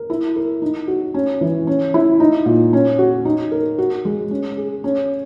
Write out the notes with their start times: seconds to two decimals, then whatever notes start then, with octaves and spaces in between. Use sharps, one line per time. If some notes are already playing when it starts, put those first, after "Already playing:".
Already playing: A#4
0.10 E4
0.36 A#4
0.62 D#4
0.88 F#4
1.14 C#4
1.41 E3
1.67 C#4
1.94 E4
2.20 D#4
2.46 A#2
2.73 C#4
2.99 F#4
3.25 D#4
3.52 A#4
3.78 F#4
4.05 G#3
4.31 C#4
4.57 G#4
4.84 C#4